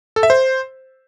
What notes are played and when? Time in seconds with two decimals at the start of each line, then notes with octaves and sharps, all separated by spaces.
0.16 A4
0.23 E5
0.30 C5